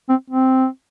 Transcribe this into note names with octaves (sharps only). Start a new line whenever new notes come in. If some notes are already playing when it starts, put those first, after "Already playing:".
C4
C4